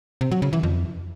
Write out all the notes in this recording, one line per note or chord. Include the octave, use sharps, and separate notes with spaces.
C3
F#3
C#3
E3
F2